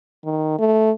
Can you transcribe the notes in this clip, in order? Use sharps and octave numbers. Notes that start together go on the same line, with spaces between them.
D#3
A3